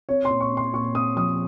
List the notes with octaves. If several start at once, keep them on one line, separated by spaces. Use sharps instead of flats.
C4 C#5
C6
A#2
C#6
C4
C6
A#2 C#6
C4 D#6
F3 D#6